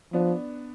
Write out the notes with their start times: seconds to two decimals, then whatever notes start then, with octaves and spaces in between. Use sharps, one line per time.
0.13 F3 B3 D4